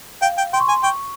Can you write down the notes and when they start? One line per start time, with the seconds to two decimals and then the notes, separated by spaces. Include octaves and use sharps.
0.21 F5 G5
0.37 G5
0.53 G5 C6
0.60 C#6
0.67 G#5 C6
0.83 G5 C#6